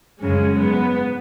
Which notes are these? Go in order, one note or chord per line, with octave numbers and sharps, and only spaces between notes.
F#2 C#3 F#3 G#3 C#4
G#2 F#3 B3